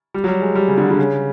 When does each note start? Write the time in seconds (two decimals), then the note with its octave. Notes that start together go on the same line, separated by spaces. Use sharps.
0.14 G3
0.24 F#3
0.28 G3
0.42 G#3
0.55 G3
0.68 C#3
0.78 D3
0.90 D3
0.98 C#3